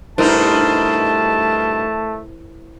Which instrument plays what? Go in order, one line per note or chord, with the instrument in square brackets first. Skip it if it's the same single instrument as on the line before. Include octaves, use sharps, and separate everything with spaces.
[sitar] G2 B2 D#4 [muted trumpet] A3 [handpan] E4 A#4 C5 [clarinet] A5